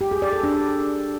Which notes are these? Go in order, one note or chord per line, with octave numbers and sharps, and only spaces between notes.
G4
G#4
D5
A4
D4